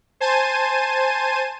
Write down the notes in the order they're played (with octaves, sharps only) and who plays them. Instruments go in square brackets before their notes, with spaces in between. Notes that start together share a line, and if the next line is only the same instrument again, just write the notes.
[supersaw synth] C5 G#5 A5 D#7